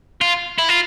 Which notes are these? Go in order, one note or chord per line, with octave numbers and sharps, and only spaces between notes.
F4
E4
F4